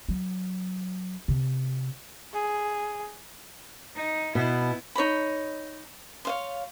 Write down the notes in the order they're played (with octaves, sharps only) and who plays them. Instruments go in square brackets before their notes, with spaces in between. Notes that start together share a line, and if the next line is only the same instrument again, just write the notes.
[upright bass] F#3
C3
[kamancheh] G#4
[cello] D#4
[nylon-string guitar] B2 [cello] B3 E4
[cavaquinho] D#4 C#5 D#5 B5
C#5 F5 C6